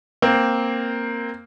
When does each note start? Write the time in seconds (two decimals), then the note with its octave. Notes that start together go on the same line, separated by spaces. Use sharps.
0.22 A#3 C4